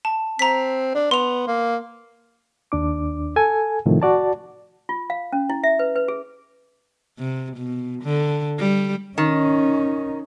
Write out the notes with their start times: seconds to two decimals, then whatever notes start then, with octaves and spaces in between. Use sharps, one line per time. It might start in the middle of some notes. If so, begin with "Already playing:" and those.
0.05 A5
0.39 C4 A#5 B6
0.95 D4
1.11 B3 C6 F7
1.47 A#3
2.72 D#2 D4 D6
3.36 A4 G#5
3.86 A2 C3 D#3 F3 A3
4.02 F#4 D5 A5
4.89 F4
5.10 F5
5.32 C#4
5.50 E4
5.64 E5
5.79 B4
5.96 B4
6.08 G#4
7.19 C3
7.57 B2
8.03 D3
8.59 G3
9.18 D#3 C#4 D#4